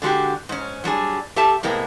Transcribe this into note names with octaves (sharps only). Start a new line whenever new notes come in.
D3 G#3 E4 F#4 G4
G#2 C#4
F#3 G3 D4 G#4
G4 A4 E5 A5
A2 C3 G#3 A#3 B3